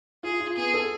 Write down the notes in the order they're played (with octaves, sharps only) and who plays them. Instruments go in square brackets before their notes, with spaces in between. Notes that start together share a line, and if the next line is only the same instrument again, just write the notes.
[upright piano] F4 [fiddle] G#4
[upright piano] F4
[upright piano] B3 [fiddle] G#4
[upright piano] A4